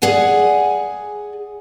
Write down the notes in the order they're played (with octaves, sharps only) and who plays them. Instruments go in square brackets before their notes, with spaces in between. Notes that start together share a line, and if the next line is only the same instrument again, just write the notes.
[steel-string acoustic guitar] G#4 D5 F#5 G#5